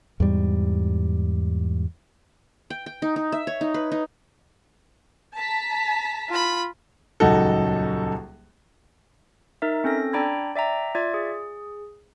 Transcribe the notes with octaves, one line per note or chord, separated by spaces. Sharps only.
E2 G#2 G3
G5
G5
D#4
D#4
E5
C#5
D#4
B4
D#4
A5 A#5 B6
F4 B5
D#1 C#2 F#2 D#4 F#4 A4
D#4 A#4 E5
C4 C#4 A4 A#6
D4 D5 G5 A#5 B5 G#6
D5 E5 G5 A#5
F4 D5 E5 G#6
G#4